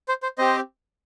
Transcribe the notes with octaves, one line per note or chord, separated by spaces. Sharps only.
C5
C5
C4 G4 C5 D#5